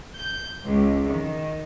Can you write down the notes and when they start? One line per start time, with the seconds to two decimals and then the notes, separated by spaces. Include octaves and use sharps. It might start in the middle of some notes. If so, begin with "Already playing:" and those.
0.15 G6
0.62 C#2
1.09 D#3